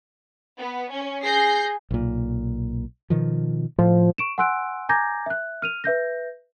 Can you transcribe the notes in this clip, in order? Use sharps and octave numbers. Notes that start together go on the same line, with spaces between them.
B3
C#4
G#4 G6 A#6 C7
B1 A#2
B2 D#3 F3
A2 F3
C#6 D7 E7
F#5 G#5 C6 E6 F#6 D7
G#5 A#5 D6 G6 G#6 A#6
E5 F#6
F6 D#7 F7
B4 E5 G6 A#6